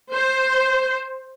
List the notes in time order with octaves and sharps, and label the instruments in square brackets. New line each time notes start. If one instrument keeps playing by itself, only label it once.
[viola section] C5